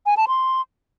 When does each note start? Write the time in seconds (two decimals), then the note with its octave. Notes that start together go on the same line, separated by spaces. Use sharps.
0.06 G#5
0.17 A5
0.28 C6